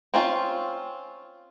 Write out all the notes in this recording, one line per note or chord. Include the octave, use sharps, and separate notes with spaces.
C4 C#4 F4